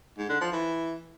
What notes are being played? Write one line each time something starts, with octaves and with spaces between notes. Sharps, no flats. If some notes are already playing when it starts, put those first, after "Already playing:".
G#2
D3
F3
E3